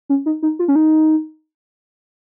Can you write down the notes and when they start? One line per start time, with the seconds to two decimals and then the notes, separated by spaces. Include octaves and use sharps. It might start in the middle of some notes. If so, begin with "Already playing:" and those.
0.09 C#4
0.26 D#4
0.43 D#4
0.59 F4
0.68 C#4
0.75 D#4